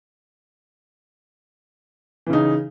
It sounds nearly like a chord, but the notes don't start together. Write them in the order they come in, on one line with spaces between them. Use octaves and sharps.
E3 C#3 D#4